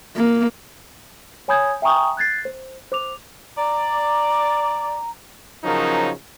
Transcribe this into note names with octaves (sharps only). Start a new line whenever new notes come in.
A#3
C#5 G#5 B5 D#6 G6 G#6
E5 G5 G#5 A#5 C#6 D#6
F#6 G#6 A6 C7
C5
C5 D6 F7
D5 A#5
C#3 F3 F#3 C#4 D#4 A#4